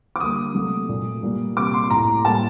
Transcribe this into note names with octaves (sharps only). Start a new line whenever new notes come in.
D6
D3 G3 A#3 D#6
C3 F#3 A3
A#2 A3
A#2 G3 A#3
C3 G3 A#3 D6
C6
A2 A3 A#5
A2 G3 A#3 A5